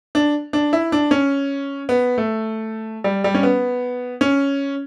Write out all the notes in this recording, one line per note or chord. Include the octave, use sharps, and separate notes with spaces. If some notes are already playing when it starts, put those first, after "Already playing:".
D4
D4
E4
D4
C#4
B3
A3
G3
G3
C#4
B3
C#4